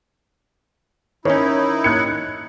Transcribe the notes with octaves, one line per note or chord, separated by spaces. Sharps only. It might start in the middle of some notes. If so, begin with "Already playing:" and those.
D#3 C#4 D#4 E4 C#5
F#6 G#6 C#7